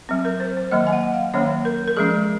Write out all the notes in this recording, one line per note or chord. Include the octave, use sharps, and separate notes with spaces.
F#3 C4
A#4
C5
C5
D#3 F#3 A#3 D#5
G#5
F#5
F5
D#3 F#3 A#3 C#4 C#5
A#4
A#4
F3 G#3 C#4 G#4